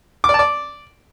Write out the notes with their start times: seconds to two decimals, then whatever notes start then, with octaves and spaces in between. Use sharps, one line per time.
0.24 D6
0.29 D5
0.34 A5
0.39 D5